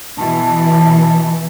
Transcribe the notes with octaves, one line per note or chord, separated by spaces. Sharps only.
B2 E3 A5